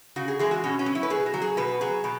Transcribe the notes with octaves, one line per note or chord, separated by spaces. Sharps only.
C#3 F#4
G#4
E3 G#3 G#4
F#4
B2 C#4
C#4
F#3
E4
B4
B2 G#4
F#4
F#3
G#4
B2 B4
F#3 G#4
B2